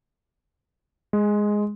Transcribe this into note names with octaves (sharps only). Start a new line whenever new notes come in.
G#3